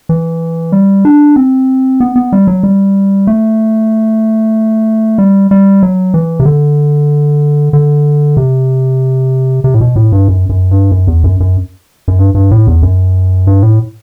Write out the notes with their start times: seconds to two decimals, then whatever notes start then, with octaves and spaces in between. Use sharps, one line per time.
0.09 E3
0.72 G3
1.05 D4
1.36 C4
2.00 B3
2.16 B3
2.33 G3
2.47 F#3
2.63 G3
3.27 A3
5.18 G3
5.51 G3
5.83 F#3
6.14 E3
6.40 C3
6.45 D3
7.73 D3
8.37 C3
9.64 C3
9.74 A2
9.81 B2
9.96 A2
10.12 G2
10.28 F#2
10.49 F#2
10.71 G2
10.92 F#2
11.07 E2
11.24 F#2
11.40 F#2
12.08 F#2
12.19 G2
12.35 G2
12.51 A2
12.67 E2
12.82 F#2
13.47 G2
13.62 A2